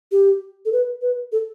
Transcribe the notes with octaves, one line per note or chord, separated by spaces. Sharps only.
G4
A4
B4
B4
A4